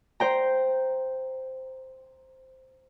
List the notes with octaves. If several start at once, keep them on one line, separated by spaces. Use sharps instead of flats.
C5 G5 A#5